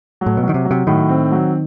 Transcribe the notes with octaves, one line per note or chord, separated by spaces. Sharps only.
F#3
A2
B2
F#3
D#3
C3
F#3
C3
A2 D#3
C4
F#3